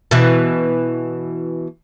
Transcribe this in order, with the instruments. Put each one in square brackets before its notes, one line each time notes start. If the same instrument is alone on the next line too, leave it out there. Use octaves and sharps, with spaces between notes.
[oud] B2 E3